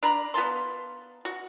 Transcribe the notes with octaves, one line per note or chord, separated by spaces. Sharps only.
D4 A#5 B5
B3 F4 A5 C6
F#4